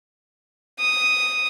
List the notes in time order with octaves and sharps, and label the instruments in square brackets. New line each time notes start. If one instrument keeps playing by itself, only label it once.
[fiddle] D#6